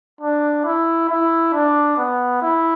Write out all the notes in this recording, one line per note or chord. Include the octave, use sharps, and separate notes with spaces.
D4
E4
E4
D4
B3
E4